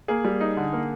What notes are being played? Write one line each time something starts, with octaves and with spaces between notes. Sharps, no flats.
A#3 G#4
G3
D#4
D3
A#3